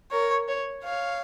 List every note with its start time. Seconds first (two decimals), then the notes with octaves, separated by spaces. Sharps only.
0.12 A#4 C#5
0.48 C#5
0.83 C#5 F5